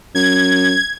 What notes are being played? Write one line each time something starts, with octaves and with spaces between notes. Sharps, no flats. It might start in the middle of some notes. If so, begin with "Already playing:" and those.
F#2 G#6